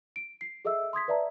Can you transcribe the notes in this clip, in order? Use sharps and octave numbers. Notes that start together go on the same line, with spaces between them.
D7
C7
G#4 A4 D#5 E5 E6
C6 D#6 G#6 B6
B4 D5 E5 A5 A#5